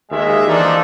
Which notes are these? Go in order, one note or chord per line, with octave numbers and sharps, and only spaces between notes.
D#2 G#3 E5
E3 F3 A#3 D4 D#4 A4